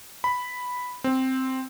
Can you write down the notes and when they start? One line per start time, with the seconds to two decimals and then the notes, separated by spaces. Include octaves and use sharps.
0.24 B5
1.04 C4